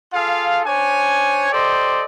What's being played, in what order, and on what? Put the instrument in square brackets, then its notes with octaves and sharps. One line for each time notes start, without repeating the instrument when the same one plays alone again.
[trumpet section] F4 G#4 A4 F5
D4 C5 C#5 G#5
G4 A4 C5 D5 D#5